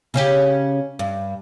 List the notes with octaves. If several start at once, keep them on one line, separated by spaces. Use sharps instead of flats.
C#3 C#4 G4
G2